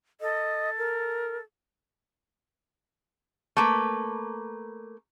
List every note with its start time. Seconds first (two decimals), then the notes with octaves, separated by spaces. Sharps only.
0.21 A4 D#5
0.78 A#4
3.57 A3 A#3 B4